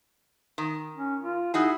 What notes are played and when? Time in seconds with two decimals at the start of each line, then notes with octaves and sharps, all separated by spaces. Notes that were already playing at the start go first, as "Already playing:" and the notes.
0.58 D#3
0.96 C#4
1.22 F4
1.54 D#4 E4 F#4 G#4